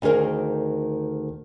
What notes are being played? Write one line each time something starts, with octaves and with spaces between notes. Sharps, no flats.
D2 D#3 G#4 A#4 C5